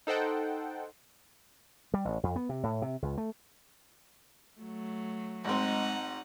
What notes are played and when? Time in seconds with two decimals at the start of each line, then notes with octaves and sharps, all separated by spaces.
0.07 D#4 A4 C5 F#5 G5 A5
1.94 G3
2.05 A1
2.23 F2
2.36 B3
2.49 C3
2.63 A2
2.82 C3
3.02 C#2
3.18 A3
4.58 F#3 A3
5.45 G#1 G#3 C4 D#4 F#5